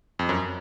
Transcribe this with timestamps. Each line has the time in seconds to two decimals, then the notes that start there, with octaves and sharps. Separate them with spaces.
0.19 F2
0.29 F#2